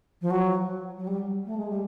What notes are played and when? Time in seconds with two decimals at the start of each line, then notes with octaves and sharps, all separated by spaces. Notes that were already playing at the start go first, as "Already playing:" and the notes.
0.21 F3
0.30 F#3
0.97 F#3
1.07 G3
1.46 A3
1.57 G#3
1.69 G3